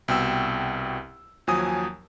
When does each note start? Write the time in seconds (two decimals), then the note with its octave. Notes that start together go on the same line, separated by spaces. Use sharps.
0.08 C2 B2 G5 E6
1.47 D#2 F3 F#3 G#5 D#6